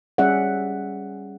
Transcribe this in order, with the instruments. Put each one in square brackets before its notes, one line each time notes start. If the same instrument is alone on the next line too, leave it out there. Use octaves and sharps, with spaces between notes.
[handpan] G3 C#4 G#4 D5 E5 F#5